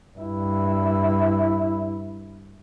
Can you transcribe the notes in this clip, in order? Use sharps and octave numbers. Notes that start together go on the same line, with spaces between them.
G2 E4